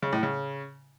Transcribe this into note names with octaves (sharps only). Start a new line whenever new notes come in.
C#3
A2
C#3